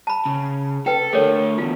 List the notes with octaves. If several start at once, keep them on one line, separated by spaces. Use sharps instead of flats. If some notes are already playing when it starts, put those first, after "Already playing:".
A5 B5
C#3
A4 B4 G5
D3 A3 A4 A#4 C#5
E2 B2 F4